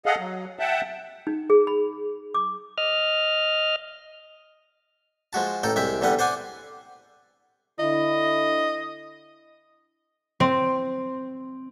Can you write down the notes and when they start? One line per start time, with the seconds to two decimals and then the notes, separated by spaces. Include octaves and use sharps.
0.06 G#4 A4 D#5 F5 F#5
0.19 F#3
0.59 E5 F#5 G5 A5
1.27 D#4
1.50 G#4
1.67 B5
2.34 D6
2.78 D#5 F6
5.33 F3 G#3 F#4 A5
5.63 A1 D#4 A4 G5
5.76 C2 G#3 E5 G5
6.01 E2 D3 G3 D#5 F#5
6.19 C5 D5 F#5 G#5
7.80 D3 E4 D#5
10.40 C4